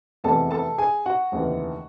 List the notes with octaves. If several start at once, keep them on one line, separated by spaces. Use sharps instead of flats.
F1 E2 C3 E3 A4 A5
A4 A5
G#4 G#5
F#4 F#5
F1 D#2 C#3 E3